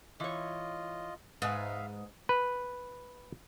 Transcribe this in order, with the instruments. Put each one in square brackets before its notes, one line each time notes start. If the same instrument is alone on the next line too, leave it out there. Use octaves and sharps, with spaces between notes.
[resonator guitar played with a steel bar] E3 C#5 [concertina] F4 D#5
[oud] G#2 [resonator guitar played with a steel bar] B4 G#5 [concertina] E5 F5
[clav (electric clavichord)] B4